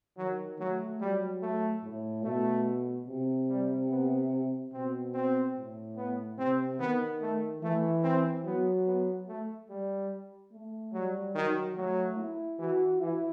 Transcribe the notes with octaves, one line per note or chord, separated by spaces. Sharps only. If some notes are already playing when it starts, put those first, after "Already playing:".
D#3 F#3
F#3 A3
F#3 G3
A3
A2
B2 A3
C3
G3
B3
B2 C4
C4
A2
B3
C3 C4
D#3 B3
A3
E3 A3
C4
F#3 B3
B3
A3
G3
A3
F#3 G3
D#3 F#3
F#3 A3
E4
E3 F#4
E3 E4